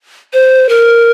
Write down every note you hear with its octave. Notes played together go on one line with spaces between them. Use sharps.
C5
A#4